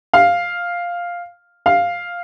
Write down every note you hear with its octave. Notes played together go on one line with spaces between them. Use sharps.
F5
F5